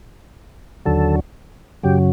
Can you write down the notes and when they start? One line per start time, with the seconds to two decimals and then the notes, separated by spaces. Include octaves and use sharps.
0.86 D#2 D3 F#3 A4
1.83 F#2 C#3 F#3 G4